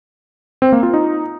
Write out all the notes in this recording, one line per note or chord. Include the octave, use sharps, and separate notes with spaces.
C4
A#3
F4
D#4